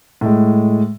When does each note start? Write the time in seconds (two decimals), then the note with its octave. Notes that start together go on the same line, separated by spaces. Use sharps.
0.21 A2 G#3